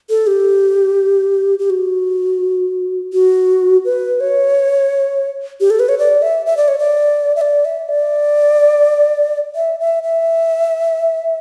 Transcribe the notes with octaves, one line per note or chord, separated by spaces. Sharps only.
A4
G4
G4
F#4
F#4
B4
C#5
G4
A4
B4
C#5
D5
E5
E5
D5
C#5
D5
E5
D5
E5
D5
E5
E5
E5